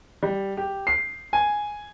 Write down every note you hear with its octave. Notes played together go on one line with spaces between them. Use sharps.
G3
G4
C7
G#5